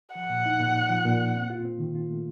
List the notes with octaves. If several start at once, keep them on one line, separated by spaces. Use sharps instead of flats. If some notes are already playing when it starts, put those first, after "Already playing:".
F3 F#5
A#2
D#4
A#2
A#2
F3
A#2
A#3
C4
F4
C4
D#3
F4
A3